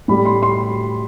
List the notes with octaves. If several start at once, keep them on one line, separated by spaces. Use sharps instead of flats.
A2 G3 B5
C6
C6